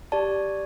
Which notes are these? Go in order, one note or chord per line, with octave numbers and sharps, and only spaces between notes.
G4 D5 A5